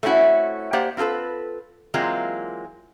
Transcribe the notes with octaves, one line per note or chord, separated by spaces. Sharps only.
A3 C4 C#4 E4 F#4
A#3 G4 C5 D5 F#5
C4 F4 G4 A4 B4
E3 F#3 G#3 A#3 C4 F4